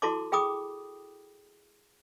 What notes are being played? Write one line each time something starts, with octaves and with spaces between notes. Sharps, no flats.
E4 F#4 A4 A5 C6 D6
G#4 G5 B5 D6 D#6